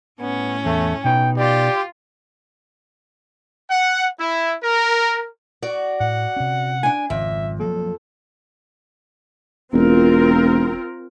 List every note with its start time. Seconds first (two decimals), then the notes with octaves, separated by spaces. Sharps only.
0.20 A2 B3 C#4
0.65 E2 A3
1.04 B2 D#4 B4 G5
1.37 F4 G4 D5
3.70 F#5
4.19 E4
4.63 A#4
5.62 F#4 D5
6.00 A2 F#5
6.36 C3 C#4
6.83 D4 G#5
7.10 G#1 F2 C#3 E5
7.60 F3 F#3 A#3 A4
9.73 E1 C4 F4 A#4